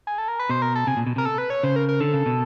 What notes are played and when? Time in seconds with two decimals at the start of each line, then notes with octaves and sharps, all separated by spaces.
0.07 G#4
0.18 A4
0.28 A#4
0.39 B4
0.49 B2 C5
0.62 A#4
0.75 A4
0.87 C3 G#4
0.97 A#2
1.07 B2
1.16 C3 A#4
1.25 A4
1.38 B4
1.50 C#5
1.63 C#3 C5
1.76 A#4
1.89 A#4
2.00 D3 A4
2.13 C#3
2.26 B2